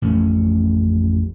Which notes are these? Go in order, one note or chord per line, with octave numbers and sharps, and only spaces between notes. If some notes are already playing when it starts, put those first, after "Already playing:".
A1 F2 A3 C#4